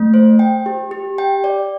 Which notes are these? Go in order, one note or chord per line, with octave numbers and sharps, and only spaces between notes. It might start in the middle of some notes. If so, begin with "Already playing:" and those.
Already playing: A3
C5
G5
G4
G4
G5
D5